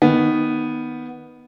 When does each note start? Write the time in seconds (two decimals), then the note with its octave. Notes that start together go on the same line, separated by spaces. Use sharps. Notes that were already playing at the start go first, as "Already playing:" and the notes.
0.02 D#3 B3